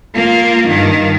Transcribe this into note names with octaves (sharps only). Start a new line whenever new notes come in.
A#3 F4
G2 D#3